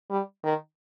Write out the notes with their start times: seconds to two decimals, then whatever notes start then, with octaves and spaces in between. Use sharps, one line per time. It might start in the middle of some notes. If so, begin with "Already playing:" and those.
0.10 G3
0.44 D#3